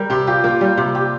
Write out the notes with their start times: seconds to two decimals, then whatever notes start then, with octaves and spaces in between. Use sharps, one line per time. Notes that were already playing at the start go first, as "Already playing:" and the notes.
Already playing: G3 A#4
0.10 C3 G4
0.27 F4 G4
0.44 A#3 F4
0.61 G3
0.77 C3
0.95 G4